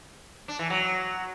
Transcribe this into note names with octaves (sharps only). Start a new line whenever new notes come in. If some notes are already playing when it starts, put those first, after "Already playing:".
D4
E3
F#3